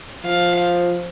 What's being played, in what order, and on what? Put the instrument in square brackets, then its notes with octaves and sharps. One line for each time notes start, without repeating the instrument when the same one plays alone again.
[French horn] F3 [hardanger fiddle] F5